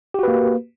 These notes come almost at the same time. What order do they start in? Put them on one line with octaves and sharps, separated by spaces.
G4 F#4 B4 A#3